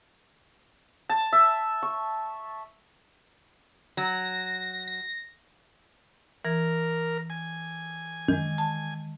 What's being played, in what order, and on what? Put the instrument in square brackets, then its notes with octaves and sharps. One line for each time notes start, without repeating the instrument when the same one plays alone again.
[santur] A5
E5
C#6
[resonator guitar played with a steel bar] F#3 [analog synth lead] A#6
[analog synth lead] A#6
[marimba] E3 [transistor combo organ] A#4
[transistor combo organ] G#5
[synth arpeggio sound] F#2 [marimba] D#3 G#3
[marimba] A5